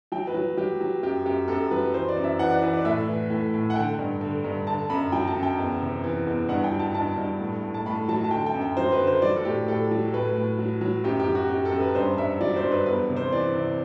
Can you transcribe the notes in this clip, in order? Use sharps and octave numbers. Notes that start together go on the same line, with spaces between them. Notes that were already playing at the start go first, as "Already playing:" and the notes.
F#3 G5
B4
F#3
F#3 G4
F#3
F#2 G4
F#2 G4
F#2 A4
F#3 B4
E3 C5
D5
F#2
E5
E3 F#5
D5
E3 B4
D5
A2 E5
E3
A2
A2
F#5
D3 G5
G2
D3
G2
D3 A5
F#2 B5
F#3 G5
A5
F#2
G5
E2
C3
E3
E2
G2 F#5
G5
F#3
A5
G2 A5
G2
A2
A2
A5
A2 B5
F#3 A5
A5
D3 G5
G5
F#2
G5
F#3 C5
B4
D3
C5
F#3 D5
A4
A2 G4
A2 A4
F#3
A2 B4
A2
F#3
F#3
F#2 G4
G4
F#3
F#4
F#2 G4
A4
F#2
B4
G2 C5
G2 E5
F#3 D5
C5
G2
B4
E2 B4
C3
C5
E3 D5
C3